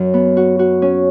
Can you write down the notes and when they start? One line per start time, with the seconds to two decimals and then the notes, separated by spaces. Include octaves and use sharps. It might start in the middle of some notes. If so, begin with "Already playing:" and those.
Already playing: F#2 F#3
0.14 B3
0.37 F#4
0.59 F#4
0.82 C#4